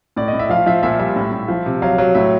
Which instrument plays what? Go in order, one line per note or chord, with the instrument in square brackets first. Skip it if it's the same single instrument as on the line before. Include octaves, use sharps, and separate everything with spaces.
[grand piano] A2 D5
D#5
A2
E5
F3 F5
F3 E5
A#2 E5
G3 E5
A2
A2
F3
C3
F#3 F5
F#3
A2 E5